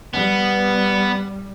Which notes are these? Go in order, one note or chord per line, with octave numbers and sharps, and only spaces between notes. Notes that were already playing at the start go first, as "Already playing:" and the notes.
G3 B3